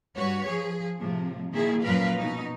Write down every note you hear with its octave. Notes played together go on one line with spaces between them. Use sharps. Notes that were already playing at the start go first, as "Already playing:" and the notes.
G2 F#4 B4 C#5
F3 G#4
A2 C3 F3
A#2 D#3 A#3 E4 G#4
F#2 A#2 F3 A#4 B4 F5
B2 D#4